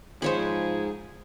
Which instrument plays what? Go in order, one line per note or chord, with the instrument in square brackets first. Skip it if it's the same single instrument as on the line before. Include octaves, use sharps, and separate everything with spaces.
[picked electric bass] G#2 [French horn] F3 [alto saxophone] G#4 [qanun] C5 C#5 B5